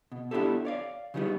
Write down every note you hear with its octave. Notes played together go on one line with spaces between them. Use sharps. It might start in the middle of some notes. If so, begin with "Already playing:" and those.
B2
B3 D4 E4 F4 G4 A4
C#5 D5 F5
C#3 F#3 G3 B3 D#4